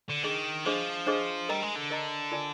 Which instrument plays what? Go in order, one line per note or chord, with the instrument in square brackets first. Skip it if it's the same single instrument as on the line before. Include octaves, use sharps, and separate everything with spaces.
[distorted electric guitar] D3
[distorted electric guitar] D#3 [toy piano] D4 G#4 D#5
[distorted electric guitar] F3 [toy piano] D4 G#4 C5 D#5
[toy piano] D4 G#4 C5 D#5
[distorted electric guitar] G3 [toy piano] A#4 D#5 A#5
[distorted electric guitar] G#3
D3
[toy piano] A#4 D#5 A#5
F4 A#4 D5 G#5